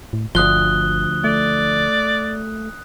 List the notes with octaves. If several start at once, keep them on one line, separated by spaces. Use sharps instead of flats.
A2
G1 D2 F3 D#6 F#6 G7
A3 D5